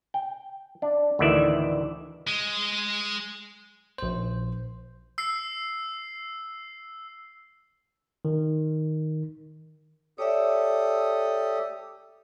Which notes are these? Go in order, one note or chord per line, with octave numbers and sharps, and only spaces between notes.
G5
D4
D2 A2 D#3 E3 D5 E5
G#3
A#1 C5
E6 C7
D#3
G4 A4 C#5 D5 E5 D#6